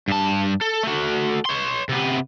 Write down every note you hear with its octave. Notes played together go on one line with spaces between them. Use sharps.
G2 A5
A4
A3 F#4
C#5 C6
C3 B3